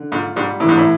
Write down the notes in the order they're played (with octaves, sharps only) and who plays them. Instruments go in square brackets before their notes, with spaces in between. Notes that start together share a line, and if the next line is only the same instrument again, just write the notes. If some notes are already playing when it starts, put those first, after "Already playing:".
Already playing: [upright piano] D3
[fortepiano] G#2 [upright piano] F4
[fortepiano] G#2 [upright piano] G3
[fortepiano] A2 [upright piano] E3
[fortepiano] G#2
A2